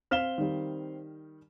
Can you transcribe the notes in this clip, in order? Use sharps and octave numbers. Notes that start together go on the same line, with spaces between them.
C4 F5 F6 B6 E7 G7
D#3 G3